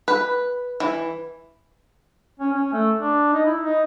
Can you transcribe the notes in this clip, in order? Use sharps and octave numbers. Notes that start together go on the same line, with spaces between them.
B4
E3
C#4
C#4
A3
D4
D#4
E4
D#4